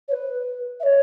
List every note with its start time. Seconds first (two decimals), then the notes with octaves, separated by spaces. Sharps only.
0.08 C#5
0.12 B4
0.80 E5
0.83 C#5